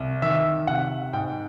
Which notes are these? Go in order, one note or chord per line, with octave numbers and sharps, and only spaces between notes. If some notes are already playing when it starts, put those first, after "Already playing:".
Already playing: C2
D#3 E5
C3 F#5
G#2 G5